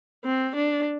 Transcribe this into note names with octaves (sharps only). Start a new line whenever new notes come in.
C4
D4